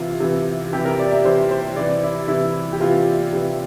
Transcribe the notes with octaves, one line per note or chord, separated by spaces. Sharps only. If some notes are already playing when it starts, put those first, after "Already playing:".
Already playing: C3 E3 F4
C3 E3
C3 E3 G4
A#4
D5
E5
C3 E3 C5
C5
C3 E3 D5
E4
C3 E3 E4
G4
C3 E3 F4
C3 E3